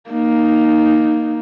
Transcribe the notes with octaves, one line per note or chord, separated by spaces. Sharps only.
A#3 D#4